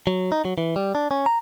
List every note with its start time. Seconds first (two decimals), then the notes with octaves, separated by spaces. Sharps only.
0.07 F#3
0.32 D#4
0.45 F#3
0.58 E3
0.76 G3
0.95 D4
1.11 C#4
1.26 A#5